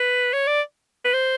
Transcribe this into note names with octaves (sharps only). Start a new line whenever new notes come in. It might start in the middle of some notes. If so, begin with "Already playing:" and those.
Already playing: B4
C#5
D5
B4
C5